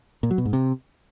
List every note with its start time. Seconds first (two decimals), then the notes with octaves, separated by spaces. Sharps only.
0.23 A#2
0.31 F#3
0.38 B2
0.46 G#2
0.53 C3